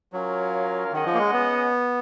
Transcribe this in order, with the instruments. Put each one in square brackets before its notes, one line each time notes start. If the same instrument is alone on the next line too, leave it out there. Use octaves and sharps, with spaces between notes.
[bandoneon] F#3 [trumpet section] C#4 F4 A#4 C#5 F5
[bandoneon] D#3 [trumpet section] C#4 G#4 D#5 F#5
[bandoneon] F3
A#3
G#3
B3